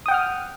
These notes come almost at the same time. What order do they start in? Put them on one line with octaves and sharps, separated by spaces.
D#6 G5 F#5 F6